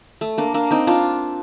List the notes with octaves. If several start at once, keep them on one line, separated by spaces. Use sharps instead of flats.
A3
A#3 D4
A#3 D4
C4 D#4
D4 F4